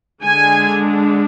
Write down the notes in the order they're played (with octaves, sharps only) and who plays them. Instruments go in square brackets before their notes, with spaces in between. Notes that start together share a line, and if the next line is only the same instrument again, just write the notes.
[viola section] D3 G#3 D4 G#5